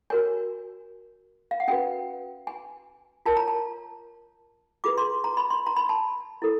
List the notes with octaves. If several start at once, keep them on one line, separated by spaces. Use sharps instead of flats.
F#4 A#4 C#5 G#5
F5
F#5
C#4 F#4 B4 G5
G#5
F4 A#4 C#5 A5
A#5
A5
F4 G#4 B4 D6
C6
A#5
B5
C6
A#5
B5
A5
E4 A4